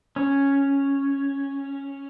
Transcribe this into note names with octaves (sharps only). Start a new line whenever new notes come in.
C#4